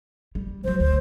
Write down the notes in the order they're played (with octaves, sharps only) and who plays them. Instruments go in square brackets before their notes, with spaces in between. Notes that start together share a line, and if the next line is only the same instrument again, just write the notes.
[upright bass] G3
[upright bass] E3 F#3 [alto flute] C5
[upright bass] D2 [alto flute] C5